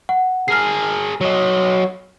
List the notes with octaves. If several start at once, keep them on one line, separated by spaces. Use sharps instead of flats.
F#5
G#4 A#4 F6 C7
F#3 D#5